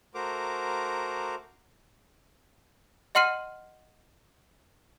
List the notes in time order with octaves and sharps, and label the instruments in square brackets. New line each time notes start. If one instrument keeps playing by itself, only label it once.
[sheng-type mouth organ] A3 F#4 A#4 C5 A#5 D6
[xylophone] D#5 F#5 C6 F6 C7 D#7